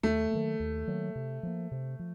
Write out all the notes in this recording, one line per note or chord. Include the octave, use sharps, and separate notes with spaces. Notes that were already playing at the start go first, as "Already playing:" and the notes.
D#2 A3
D#3 F#3 A#3
D#2
D#3 F#3 A#3
C3
F3 A#3
C3
F3